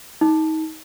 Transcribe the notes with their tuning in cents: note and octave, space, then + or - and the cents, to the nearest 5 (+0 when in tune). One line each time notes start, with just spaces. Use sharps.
D#4 +30